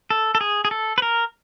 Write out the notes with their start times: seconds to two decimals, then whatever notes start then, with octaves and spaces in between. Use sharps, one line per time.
0.10 A4
0.35 A4
0.41 G#4
0.65 G#4
0.71 A4
0.98 B4
1.02 A#4